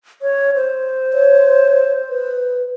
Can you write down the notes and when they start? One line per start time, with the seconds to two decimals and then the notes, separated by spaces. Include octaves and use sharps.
0.22 C#5
0.56 C5
1.13 C#5
2.09 B4